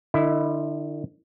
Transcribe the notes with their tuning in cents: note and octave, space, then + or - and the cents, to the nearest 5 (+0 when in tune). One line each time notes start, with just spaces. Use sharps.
D3 +35 E4 +0 D#5 +0